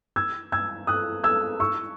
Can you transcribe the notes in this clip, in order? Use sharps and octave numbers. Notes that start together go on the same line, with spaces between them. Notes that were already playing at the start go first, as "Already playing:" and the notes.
E6 G#6
E6 G#6
D#6 F#6
E6 G#6
C#6 E6